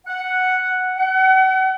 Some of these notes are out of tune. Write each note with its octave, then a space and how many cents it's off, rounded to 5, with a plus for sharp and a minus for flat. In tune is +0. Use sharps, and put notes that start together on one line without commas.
F#5 +0
F#5 +35